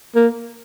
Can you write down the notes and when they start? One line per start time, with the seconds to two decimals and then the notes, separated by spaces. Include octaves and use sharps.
0.16 A#3